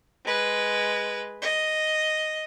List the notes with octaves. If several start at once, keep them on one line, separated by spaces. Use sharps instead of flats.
G#3 B4
D#5